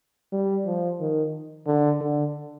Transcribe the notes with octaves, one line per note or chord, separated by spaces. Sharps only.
G3
F3
D#3
D3
D3